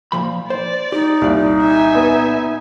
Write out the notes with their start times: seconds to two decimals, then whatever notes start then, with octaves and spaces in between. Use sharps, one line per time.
0.12 A#2 F3 B5
0.50 C5 D5
0.92 D#4 G4
1.21 C2 A#2 D5
1.62 E5 G#5
1.95 B3